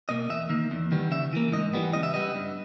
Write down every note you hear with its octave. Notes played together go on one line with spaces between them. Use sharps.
B2 A#3 D#5
E2 E5
D#3 A#3
E2
D#3 G3 B3
C#3 E5
E3 A#3
G#2 D#5
E3 G3 B3
C#3 D#5
E5
G3 B3 D#5
G2